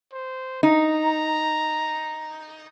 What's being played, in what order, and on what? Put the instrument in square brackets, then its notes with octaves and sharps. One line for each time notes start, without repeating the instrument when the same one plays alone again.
[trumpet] C5
[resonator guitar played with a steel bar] D#4 [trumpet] A#5